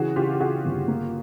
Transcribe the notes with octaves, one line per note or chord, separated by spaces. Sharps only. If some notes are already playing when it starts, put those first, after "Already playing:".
Already playing: C#3 E3 F#4 G#4
C#3 F4 G4
G4
C#3 F#4 G#4
G1
A#3